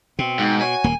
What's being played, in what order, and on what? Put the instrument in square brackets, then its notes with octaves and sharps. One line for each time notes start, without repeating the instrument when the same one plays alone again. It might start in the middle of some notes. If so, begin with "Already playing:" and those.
[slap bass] B2 [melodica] C4
[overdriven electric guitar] G#2
[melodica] F#4 C#5 [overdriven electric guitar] G#5
[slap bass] D#1 A#3